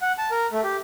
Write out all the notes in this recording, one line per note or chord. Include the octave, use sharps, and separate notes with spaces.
F#5
A5
A#4
A3
G4